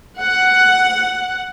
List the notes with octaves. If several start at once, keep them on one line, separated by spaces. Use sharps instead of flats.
F#5